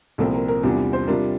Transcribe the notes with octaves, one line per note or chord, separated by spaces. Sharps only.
C2 A#2 F3 C4 A4
A#4
A#4
E2 C3 G3 D4 F4 A#4
C5
C3 G3 D4 F4 A#4